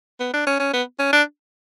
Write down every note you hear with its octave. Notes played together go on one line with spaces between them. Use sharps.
B3
D4
C#4
C#4
B3
C#4
D4